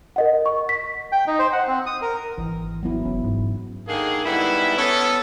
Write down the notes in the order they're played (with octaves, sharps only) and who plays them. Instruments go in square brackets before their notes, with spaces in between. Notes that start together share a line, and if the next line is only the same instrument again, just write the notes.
[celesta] A#4 D#5 F#5
C#6
B6
[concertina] G5
D#4
C5
F#5
C4
D#6
A#4
[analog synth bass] G#1 [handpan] E3
[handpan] F#3 B3 E4
[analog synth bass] F1 [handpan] C#4
[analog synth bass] G#2
[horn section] D3 D#3 A#3 G#4
G#2 G3 B3 E4
B3 C#4 A4